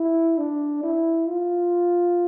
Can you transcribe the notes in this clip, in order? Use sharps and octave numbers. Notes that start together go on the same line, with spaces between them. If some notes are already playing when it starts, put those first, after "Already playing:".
Already playing: E4
D4
E4
F4